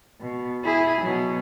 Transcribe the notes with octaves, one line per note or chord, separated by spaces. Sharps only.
B2
E4 G#4
B2 F#3